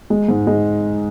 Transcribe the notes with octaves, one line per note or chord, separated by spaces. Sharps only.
G#3
G#2
G#3